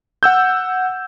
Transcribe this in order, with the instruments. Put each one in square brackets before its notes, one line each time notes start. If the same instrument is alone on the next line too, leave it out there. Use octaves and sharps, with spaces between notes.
[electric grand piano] F#5 E6 G6